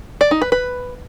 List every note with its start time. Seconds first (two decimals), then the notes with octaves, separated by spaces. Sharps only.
0.21 D5
0.31 D#4
0.42 B4
0.52 B4